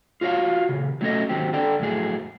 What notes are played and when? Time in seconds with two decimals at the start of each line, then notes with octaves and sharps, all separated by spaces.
0.21 F4 F#4 C#5 D#5 F5
0.69 A#2 C#3
1.01 F#3 A3 C#4 A4 D#5
1.29 G#2 D#3 F#3 C4 G4
1.53 D3 A4 D5 G5
1.80 F2 A2 F#3 G#4